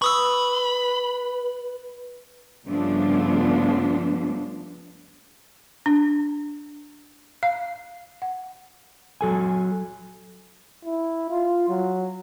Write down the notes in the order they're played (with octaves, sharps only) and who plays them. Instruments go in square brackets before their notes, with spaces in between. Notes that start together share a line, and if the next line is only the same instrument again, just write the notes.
[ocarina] B4 [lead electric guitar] B5 [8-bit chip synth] C#6 D#6 E6
[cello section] G2 C#3 F3 A3 B3 D4
[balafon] D4
F5
F#5
[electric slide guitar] F#3 A4 G#5
[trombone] E4
F4
F#3